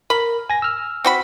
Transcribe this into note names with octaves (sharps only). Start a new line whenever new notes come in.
A#4 B5
G#5 A#6
E6 F6
C4 F#4 B5